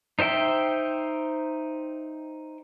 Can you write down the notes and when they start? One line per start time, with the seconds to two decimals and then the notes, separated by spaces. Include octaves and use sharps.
0.19 D#4 C5 E5 G5